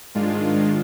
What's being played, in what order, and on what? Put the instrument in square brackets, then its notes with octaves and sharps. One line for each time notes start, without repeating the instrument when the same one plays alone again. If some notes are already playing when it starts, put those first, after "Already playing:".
[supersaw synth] G#2 D#3 G#3 D4 F4